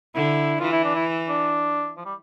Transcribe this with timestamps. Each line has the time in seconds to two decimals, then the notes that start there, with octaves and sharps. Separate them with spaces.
0.15 D3 E4
0.60 E3 F4
0.72 E4
0.84 D4
0.95 E4
1.29 D4
1.97 F3
2.06 G3